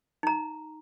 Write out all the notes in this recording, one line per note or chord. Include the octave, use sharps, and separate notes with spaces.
D#4 A#5